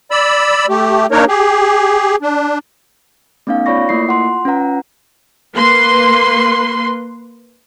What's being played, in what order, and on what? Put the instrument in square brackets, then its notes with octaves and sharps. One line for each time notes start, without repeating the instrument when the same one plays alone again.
[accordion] D5 B5 E6
A3 G4
A#3 D4 D#4 A#4 C#5
G4 G#4
D4
[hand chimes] A3 B3 C#4 D#4 F5
F4 C#5 D5 B5 C#6 A#6
A3 A#3 E4 C7
F4 F#5 C6
C#4 F4 B4 F#5 A#5
[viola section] A#3 B4 C6